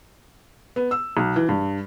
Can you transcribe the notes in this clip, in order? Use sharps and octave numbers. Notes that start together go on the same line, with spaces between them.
B3
E6
B1
E3
G2